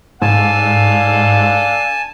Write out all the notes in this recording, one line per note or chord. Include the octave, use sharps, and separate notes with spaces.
G#2 D4 A4 F5 G#5 A5